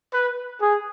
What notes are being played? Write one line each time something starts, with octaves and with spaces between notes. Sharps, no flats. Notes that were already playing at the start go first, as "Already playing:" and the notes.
B4
G#4